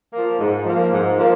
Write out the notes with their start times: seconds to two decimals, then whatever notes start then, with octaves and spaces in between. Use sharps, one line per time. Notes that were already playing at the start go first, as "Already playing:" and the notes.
0.13 F3 A#3
0.39 G#2
0.65 F3 A#3
0.92 G#2
1.19 F3 A#3